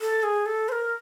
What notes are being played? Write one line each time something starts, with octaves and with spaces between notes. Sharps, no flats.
A4
G#4
A4
C5
A#4